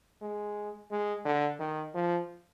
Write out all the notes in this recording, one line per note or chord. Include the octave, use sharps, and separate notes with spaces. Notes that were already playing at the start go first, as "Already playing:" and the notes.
G#3
G#3
D3
D#3
F3